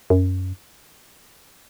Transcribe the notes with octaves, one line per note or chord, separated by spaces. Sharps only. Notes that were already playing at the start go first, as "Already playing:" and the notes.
F#2